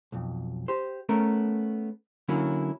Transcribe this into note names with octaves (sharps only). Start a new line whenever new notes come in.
B1 F2
G4 C5
A3 B3 C#4 A#4
D3 F#3 A#3 C#4 E4